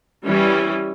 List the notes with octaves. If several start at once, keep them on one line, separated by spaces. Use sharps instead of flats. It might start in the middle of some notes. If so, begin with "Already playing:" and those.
E3 G3 C#4